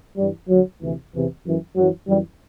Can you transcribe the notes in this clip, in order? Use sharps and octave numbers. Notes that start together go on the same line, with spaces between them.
G2 E3 G3
D2 D3 F#3
D2 C3 E3
E2 C3 E3
F#2 E3
F#2 E3 F#3
F#2 E3 G3